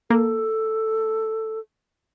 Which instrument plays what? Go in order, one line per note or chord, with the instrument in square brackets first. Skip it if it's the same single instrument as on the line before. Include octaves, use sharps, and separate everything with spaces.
[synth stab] A#3 [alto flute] A4